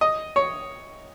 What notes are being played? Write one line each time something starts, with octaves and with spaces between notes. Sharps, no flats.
D#5
C#5